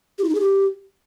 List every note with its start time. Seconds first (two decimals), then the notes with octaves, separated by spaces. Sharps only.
0.19 G4
0.24 E4
0.29 D#4
0.35 G#4
0.40 G4